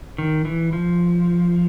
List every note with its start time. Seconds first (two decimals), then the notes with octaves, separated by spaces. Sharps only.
0.18 D#3
0.45 E3
0.73 F3